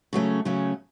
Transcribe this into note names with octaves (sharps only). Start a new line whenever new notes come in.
C#3 F#3 A3 C#4
C#3 F#3 A3 C#4